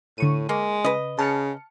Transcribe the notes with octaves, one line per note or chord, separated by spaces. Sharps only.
A2 D3 C#6 D#7
G#3 A#3
C#3 B4 D#5
C#3 A5 F6 C#7